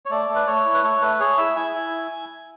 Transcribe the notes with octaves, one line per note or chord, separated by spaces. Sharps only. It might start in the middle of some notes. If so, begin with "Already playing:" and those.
C#5
A3 D5
A3
B4
A3 C#5
E4
B4
A3 C#5
A3 B4
G#4 C#5
E4 E5
E4 G#5
E4